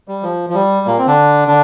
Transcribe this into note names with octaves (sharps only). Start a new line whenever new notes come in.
G3
F3
F3
G3
A#2 A#3
C4
D3 D4
D3 D4